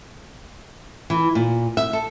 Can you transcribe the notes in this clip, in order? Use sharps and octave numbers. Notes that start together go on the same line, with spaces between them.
E3
A#2
E5
A4